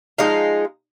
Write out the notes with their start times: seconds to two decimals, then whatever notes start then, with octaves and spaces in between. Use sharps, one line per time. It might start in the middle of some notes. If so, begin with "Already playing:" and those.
0.18 F3 G#3 D#4 F5